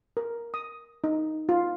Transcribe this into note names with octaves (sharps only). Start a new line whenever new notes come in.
A#4
D#6
D#4
F4